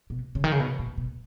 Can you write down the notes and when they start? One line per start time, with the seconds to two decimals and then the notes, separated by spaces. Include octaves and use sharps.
0.10 B2
0.35 C#3
0.44 D#3
0.52 C#3
0.60 B2
0.79 A#2
0.98 B2